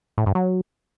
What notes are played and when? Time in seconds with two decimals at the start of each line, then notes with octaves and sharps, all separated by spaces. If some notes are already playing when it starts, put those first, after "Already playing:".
0.18 A2
0.26 G2
0.35 F#3